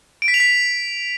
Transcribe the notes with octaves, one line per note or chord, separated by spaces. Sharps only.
D7
B6
F7
B6